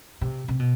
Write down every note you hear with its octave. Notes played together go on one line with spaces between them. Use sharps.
C3
C3
B2